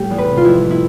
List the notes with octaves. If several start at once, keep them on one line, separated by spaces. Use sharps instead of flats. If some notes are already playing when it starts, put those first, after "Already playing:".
Already playing: A2 G3 G4
E2
B4
C3
F4
F2 E4
F2
E4